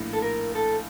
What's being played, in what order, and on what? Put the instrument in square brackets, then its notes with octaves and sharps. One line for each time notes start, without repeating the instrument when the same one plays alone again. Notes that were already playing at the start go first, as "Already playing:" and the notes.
Already playing: [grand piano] A#1 A2 A#3
[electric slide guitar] A4
A#4
A4